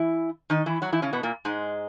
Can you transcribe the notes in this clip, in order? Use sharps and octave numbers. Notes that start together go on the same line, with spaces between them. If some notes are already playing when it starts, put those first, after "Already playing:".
Already playing: E3 E4
D#3 D#4
E3 E4
F#3 F#4
E3 E4
C#3 C#4
B2 B3
A#2 A#3
G#2 G#3